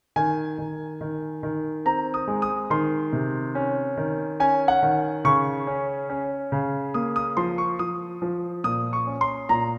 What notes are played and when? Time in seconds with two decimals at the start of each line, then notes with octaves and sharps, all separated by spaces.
0.16 D#3 G#5
0.58 D#3
1.01 D#3
1.43 D#3
1.85 C4 A#5
2.14 D#6
2.28 G#3
2.42 D#6
2.70 D#3 C6
3.13 C3
3.55 C#4
3.97 D#3
4.40 C#4 G#5
4.68 F#5
4.82 D#3
5.24 C#3 C#6
5.67 C#4
6.10 C#4
6.52 C#3
6.94 A#3 D#6
7.16 D#6
7.37 F3 C6
7.58 C#6
7.79 F3 D#6
8.22 F3
8.64 A#2 D#6
8.93 C#6
9.07 C#4
9.21 C6
9.49 A#2 A#5